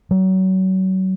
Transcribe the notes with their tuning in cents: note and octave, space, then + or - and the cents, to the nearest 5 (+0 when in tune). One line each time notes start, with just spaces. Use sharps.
F#3 +30